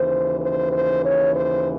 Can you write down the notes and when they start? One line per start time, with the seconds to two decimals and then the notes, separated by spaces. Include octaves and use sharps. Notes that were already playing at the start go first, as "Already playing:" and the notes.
Already playing: D#2 C#3 E3 C5
0.41 C5
0.72 C5
1.03 C#5
1.34 C5